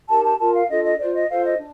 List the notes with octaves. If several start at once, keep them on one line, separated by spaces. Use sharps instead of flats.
D#4 G4 A#4 A5
A5
F4 A#4 A5
F5
D4 F4 A4 D#5
D#5
F4 C5 D5
D#5
F4 A4 C5 F5
D#5
D4